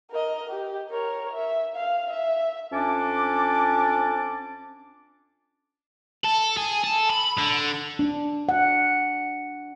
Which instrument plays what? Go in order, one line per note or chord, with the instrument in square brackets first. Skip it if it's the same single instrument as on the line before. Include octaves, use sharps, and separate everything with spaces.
[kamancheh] A#4 D#5
G4
A#4 C#5
E5
F5
E5
[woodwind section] F2 C#4 D4 A5 D6
[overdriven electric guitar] A4
G#4
A4
B5
D3
[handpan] D4
F#5